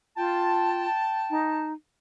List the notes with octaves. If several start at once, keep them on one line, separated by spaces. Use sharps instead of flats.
F4 G5 A5
D#4